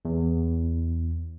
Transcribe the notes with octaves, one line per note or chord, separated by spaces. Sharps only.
E2